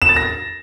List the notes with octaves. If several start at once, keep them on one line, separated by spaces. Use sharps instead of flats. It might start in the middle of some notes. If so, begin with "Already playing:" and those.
E7
A6
A#6